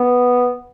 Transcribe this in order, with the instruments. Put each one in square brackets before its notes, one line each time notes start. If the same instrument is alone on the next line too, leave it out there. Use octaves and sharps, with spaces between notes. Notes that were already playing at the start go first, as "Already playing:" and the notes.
Already playing: [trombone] B3